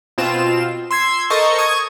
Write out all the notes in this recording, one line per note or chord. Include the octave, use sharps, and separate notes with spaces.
B2 C4 F4 E7
C6 E6 G#6 C7
A4 A#4 C5 D#5 A5 C#6
C#6 D#6 G#6